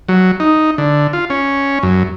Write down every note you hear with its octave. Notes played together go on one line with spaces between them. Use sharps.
F#3
D#4
D3
F4
C#4
F#2